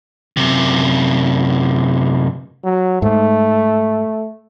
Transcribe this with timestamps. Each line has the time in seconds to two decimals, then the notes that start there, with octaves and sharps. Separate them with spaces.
0.37 F#2 C3
2.64 F#3
3.02 G#2 A3